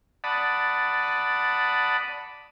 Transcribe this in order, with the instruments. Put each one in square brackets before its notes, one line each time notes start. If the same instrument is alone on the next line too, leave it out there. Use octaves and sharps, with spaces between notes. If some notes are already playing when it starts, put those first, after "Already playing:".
[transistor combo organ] D5 F#5 A5 B5 D#6